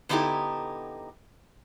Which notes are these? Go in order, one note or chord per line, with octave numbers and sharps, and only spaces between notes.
D3 B3 D#4 E4 G4 A4